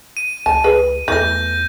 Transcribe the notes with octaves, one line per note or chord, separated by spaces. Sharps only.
D#7
C#2 A5
G#4 B4
E2 E3 A3 G6 A#6